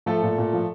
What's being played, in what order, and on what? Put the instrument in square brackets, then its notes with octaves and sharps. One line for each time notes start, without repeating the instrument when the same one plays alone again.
[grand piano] F3 A3 A4
A#2
A#2
F3